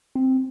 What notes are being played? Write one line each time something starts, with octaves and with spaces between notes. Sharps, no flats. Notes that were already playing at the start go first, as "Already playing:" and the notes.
C4